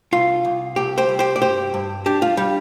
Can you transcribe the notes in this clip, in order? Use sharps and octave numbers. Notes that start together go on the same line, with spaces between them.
C2 F4
C2
C2 G4
G4 C5
C2
G4 C5
D5
G2 G4 C5
G2
D4 G4
F4
G3 G4